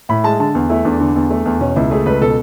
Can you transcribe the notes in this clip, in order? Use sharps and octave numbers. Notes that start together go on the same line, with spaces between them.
A2 B5
G#3 A5
D3 A5
E2
A3 E4
E2 D4
D3
E2
A3
E2
B2 C#4
C#2 E4
A3 G#4
C#2 B4
B2 A4